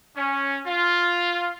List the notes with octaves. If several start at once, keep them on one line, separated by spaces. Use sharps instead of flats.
C#4
F4